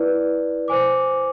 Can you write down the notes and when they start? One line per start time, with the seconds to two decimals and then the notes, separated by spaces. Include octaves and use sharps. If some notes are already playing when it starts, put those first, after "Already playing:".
Already playing: E4 B4 D5
0.68 C5 G#5 D6